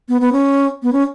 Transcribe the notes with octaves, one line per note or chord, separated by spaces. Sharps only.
B3
B3
C#4
B3
C#4